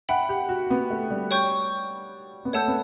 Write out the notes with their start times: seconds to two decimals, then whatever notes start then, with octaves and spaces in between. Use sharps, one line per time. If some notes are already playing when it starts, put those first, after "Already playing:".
0.09 E5 F#5 G5 B5
0.29 G4
0.49 F#4
0.70 B3
0.90 A3
1.10 G3
1.31 C#5 G5 C#6 G6
2.45 B3
2.53 A3 C#5 F#5 A5 E6 G6
2.68 B3